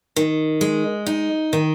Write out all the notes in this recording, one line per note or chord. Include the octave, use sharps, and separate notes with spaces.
D#3
G#3
D#4
D#3